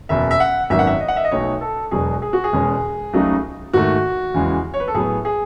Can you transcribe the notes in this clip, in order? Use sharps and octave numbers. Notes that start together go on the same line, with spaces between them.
F#1 E2 B2 E5
E5
F#5
G#1 F#2 D#3 F#3 B3 E5
F#5
E5
D#5
F#5
E5
D#5
B1 B2 A3 D#4 C#5
A4
E1 E2 B2 F#3 G#4
G#4
F#4
G#4
E1 E2 B2 G#3 C#4
C#2 C#3 F#3 A3 D#4
G#2 D#3 A3 F#4
E2 C#3 E3 G#3
C#5
B4
A4
A2 F#3 B3 G#4
G#4